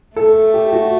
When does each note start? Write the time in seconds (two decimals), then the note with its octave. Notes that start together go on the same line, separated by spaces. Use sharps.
0.16 A3 A4
0.54 G4
0.73 F#4